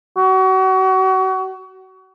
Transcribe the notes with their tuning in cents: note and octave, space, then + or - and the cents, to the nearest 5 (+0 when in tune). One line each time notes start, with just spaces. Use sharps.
F#4 +30